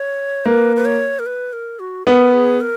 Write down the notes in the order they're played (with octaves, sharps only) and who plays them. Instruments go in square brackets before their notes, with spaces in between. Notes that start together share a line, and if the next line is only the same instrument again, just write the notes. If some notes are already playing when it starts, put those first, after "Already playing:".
Already playing: [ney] C#5
[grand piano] A#3 [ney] B4
[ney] B4
C#5
A#4
B4
A#4
F#4
[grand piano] B3 [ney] A#4
[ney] G#4
A#4